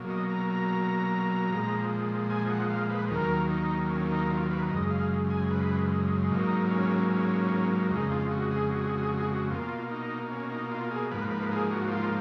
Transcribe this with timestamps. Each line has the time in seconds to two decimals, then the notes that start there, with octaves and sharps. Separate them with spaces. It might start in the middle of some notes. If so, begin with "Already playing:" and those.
Already playing: B2 F#3 A#3
0.10 D#5
0.30 A#5
0.49 A#5
1.50 A#2 F3 G#3
2.30 G#5
2.50 F#5
2.70 F5
2.90 B4
3.10 D#2 D#3 F#3 A#3 A#4
3.50 D#4
3.90 C#4
4.10 D#4
4.30 F4
4.50 B4
4.70 F#2 C#3 G#3 D#5
4.90 F5
5.30 G#5
5.51 B4
6.30 G#2 F#3 A#3 D#4
6.70 C#4
7.10 C#4
7.91 F2 C#3 G#3 D#4
8.11 F4
8.31 F#4
8.51 G#4
8.71 F#4
8.80 G#4
8.90 F#4
8.98 G#4
9.08 F#4
9.17 G#4
9.27 F#4
9.51 B2 A#3 F4
9.91 D#4
10.31 C#4
10.51 D#4
10.71 F4
10.91 G#4
11.11 G#2 F3 A#3 B4
11.31 B4
11.52 G#4
11.71 F#4
11.91 F4